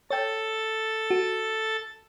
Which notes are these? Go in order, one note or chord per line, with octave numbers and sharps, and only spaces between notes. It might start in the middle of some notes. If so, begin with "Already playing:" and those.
A4 C#5 G5 A6
F#4